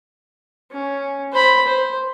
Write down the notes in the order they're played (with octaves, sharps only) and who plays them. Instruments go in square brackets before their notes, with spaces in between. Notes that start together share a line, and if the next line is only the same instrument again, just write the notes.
[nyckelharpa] C#4
C5 B5
C5